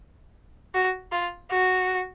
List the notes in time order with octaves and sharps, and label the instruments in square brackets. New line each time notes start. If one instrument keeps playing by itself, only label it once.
[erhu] F#4
F4
F#4